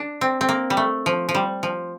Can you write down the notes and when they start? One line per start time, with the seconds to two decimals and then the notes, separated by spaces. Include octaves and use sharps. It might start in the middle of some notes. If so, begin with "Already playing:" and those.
Already playing: D4
0.21 C4
0.41 C4
0.49 A#3
0.70 G3
0.77 A3
1.06 F3
1.29 F3
1.35 G3
1.63 F3